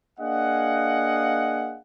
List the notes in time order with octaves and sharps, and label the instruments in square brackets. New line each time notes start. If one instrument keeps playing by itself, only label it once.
[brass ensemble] A#3 D4 G#4 D#5 F5 F#5